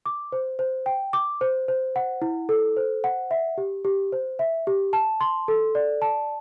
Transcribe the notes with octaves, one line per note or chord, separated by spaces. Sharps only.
D6
C5
C5
G5
D6
C5
C5
F#5
E4
A4
C5
F#5
E5
G4
G4
C5
E5
G4
A5
C6
A4
D5
A5